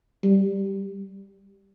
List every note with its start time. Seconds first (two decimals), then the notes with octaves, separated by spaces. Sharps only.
0.24 G3